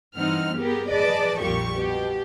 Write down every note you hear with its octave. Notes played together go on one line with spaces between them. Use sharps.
G2 E3 C4 D#4 F#5 F6
B3 G4 G#4 A#4
G#4 B4 D5 D#5 A5 D6
A#1 F2 A#2 G3 G4 C#6
B2 G4